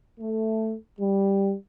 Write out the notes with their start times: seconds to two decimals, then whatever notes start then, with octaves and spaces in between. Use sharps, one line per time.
0.20 A3
0.99 G3